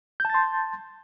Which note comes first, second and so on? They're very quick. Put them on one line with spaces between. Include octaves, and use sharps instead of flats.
G6 A5 A6 C6